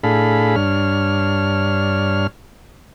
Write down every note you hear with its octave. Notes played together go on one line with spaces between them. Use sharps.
A2 D4 G#4 A4 F5 B5
G2 D4 C#5 F6